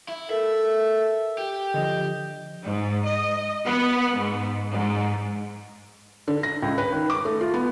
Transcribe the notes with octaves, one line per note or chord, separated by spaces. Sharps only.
E4
A4 A#4 E5
G4
D3 F3 D#5
G#2
D#5
B3
G#2
G#2
D3
A#6
C#2
B4
D#3
D6
A3
F4
B3